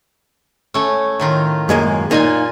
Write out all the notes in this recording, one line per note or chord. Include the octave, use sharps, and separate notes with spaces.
A3 C#4
A2 D#3 F4
F#2 G#3 A#3
A#2 A#3 D#4 F4 G#5